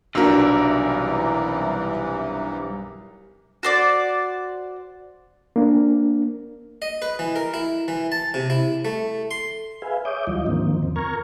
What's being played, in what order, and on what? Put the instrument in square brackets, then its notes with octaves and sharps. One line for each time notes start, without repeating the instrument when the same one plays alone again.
[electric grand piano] B1 A#4 [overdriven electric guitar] G2 [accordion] C3 E3 [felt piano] D4 F#4 E6
[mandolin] F#4 C5 D5
[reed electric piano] A#3 D4
[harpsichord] D#5
B4
E3
A#4
E4
E3
A5
C3
E4
A3
C6
[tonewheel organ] G#4 B4 E5 F5 G#5
C#5 E5 D6 D#6 G6
D2 E3 F#3 G3 F4 D#5
G#2 D3 D#3 F3 A#3 C4
E2 C4
A#4 A#5 C#6 F6 G#6